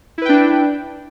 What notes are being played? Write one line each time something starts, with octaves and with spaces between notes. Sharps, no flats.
D4 E4 B4 G5